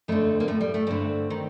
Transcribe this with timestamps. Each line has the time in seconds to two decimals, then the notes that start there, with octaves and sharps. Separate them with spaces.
0.08 F2 D3 A3 C4
0.40 A#3
0.48 A2 A3
0.61 G3
0.74 A3
0.87 G2 D3 A3 C4
1.30 D#3